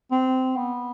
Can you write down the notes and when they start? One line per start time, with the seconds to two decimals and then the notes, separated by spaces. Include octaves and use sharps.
0.11 C4
0.56 B3